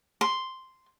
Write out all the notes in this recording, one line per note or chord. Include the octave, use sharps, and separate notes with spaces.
C6